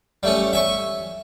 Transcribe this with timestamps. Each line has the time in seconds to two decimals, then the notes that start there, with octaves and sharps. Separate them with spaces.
0.23 G3 A3 C#4
0.53 E5 G#5 C#6